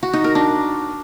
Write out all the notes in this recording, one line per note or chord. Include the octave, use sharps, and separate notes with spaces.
F#4
D#4
A#4
D4